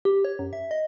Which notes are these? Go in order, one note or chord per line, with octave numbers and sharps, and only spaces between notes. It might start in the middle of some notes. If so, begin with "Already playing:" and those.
G4
C#5
F#2
E5
D#5